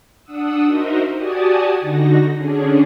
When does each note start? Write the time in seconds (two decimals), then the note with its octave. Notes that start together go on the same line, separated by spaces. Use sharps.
0.24 D4 F#5 D#6 E6
0.65 D#4 F#4 A#4 C5 D#5 E5
1.16 F#4 G4 D5 G#5 A5 D#6
1.81 D3 D#4 F#4 A#6
2.36 D3 C#4 D4 G#4